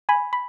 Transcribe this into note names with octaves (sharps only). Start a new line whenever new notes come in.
G#5 B5
B5